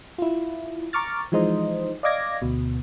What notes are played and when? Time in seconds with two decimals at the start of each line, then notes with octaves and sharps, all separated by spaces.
0.18 E4 F4
0.93 A#5 C#6 D6 F6 A6
1.32 E3 F3 G#3 D#4 C5 D#5
2.03 D5 D#5 F5 D6 G#6 A#6
2.42 D2 B2